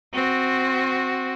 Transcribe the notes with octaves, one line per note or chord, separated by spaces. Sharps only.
C4 F#4